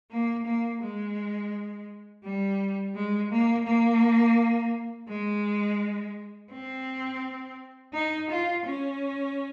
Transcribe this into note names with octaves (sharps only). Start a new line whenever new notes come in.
A#3
A#3
G#3
G3
G#3
A#3
A#3
G#3
C4
D#4
F4
C#4